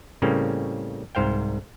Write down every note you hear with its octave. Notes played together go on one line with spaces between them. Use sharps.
A2 C#3 G3 A#3 C4 C#4
C2 G#2 C5 F5 G5